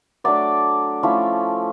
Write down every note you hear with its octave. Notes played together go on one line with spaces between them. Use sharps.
F#3 A3 D4 D5 E5
F3 A3 C#4 E4